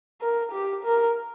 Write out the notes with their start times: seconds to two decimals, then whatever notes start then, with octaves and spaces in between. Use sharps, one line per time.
0.21 A#4
0.52 G4
0.84 A#4